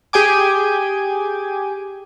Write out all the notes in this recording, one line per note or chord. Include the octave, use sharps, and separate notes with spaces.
G4 G#4 G5 G#5 D6